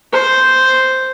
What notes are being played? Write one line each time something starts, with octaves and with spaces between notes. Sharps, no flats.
C5